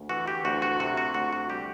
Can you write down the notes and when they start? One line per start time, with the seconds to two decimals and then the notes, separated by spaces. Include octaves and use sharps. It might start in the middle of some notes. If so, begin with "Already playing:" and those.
Already playing: D2
0.09 E3 F#4
0.28 G4
0.45 D2 F#4
0.62 F#4
0.80 C3 F#4
0.97 F#4
1.14 D2 F#4
1.33 F#4
1.49 G3 G4